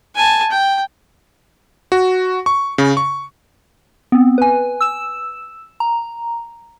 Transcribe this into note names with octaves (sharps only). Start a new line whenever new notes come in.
G#5 A5
G5
F#4
C#6
C#3
C#6
B3 C4
B4 G#5
E6 E7
A#5